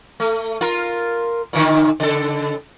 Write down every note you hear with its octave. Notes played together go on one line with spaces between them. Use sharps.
A3
F4 A#4
A#2 D3 D#3
C#3 A4